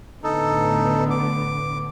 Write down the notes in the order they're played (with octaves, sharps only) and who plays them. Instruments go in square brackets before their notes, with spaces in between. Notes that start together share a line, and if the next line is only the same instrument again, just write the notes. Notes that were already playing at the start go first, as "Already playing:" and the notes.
[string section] A2 D3 B3 [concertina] D#4 A4
[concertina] D6